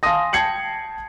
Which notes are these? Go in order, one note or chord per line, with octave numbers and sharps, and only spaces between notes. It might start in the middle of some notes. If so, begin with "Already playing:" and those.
F5 G#5 A5 C6 D#6 A#6
G5 A5 G#6 C7 C#7 F#7